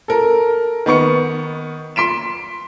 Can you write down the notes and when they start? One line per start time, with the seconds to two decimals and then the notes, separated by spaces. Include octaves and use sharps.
0.08 A4 A#4
0.86 D#3 B3 C#6 C#7
1.96 C6 B6 D7 E7